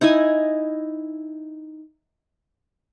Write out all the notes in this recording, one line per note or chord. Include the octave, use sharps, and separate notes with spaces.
D#4 E4 D#5 G#5